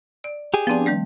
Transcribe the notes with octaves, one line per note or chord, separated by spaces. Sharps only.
D5
G4 G#4
F3 B3 C4 D4
D#3 G3 A3